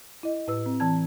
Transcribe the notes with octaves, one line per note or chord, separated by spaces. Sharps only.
E4 D#5
A2 E4 B4 E6
C4
E3 C4 A5 G#6